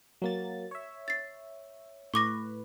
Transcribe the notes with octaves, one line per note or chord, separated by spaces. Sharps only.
F#3 A#3 A6
C#5 E5
A6 C7
A2 B4 C#6 D6 A#6